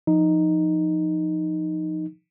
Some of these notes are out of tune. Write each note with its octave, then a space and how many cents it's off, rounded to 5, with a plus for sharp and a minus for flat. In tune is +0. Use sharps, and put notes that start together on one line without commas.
F3 +0 D#4 +0